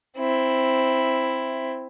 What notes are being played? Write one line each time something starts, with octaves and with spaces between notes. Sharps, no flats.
C4 E4